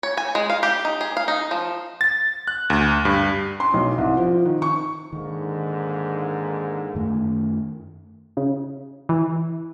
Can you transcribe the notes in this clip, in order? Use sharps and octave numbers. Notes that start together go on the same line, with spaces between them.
C#5
G#5
G#3
F5
G4
D#4
G#4
F5
D#4
F3
A6
F#6
D2
G2
C6
B1
C2
F3
D#3
C#6
G#2 D3 D#3 A#3
F#2 D#3 A3
C#3
E3